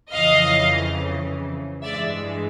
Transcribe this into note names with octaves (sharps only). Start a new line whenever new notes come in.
F2 C#3 E3 D#5 F5
G2 E3 G#3 D5 E5